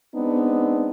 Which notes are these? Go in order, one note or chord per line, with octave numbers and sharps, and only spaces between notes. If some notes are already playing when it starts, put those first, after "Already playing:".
G#3 B3 C4 D4 D#4